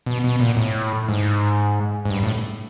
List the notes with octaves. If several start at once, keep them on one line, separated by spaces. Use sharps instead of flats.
B2
B2
A#2
A2
G#2
G#2
G2
A2